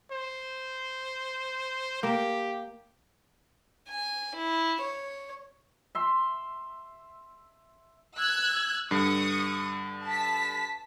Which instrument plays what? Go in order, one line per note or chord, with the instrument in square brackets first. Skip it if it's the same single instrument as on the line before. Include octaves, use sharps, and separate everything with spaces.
[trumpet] C5
[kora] A#3 [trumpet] G4
[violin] G#5
E4
C#5
[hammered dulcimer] E5 C6
[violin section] E6 F#6 G#6
[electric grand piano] G2 D3 C7 [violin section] C#6 D#6
[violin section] A5 B6